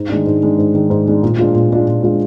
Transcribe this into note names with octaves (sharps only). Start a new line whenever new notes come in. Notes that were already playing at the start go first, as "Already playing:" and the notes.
Already playing: G#2
D#3 G#3 D4
G#2
D#3 G#3 D4
G#2
D#3 G#3 D4
G#2
D#3 G#3 D4
A#2
G#3 D4 F4
A#2
G#3 D4 F4
A#2
G#3 D4 F4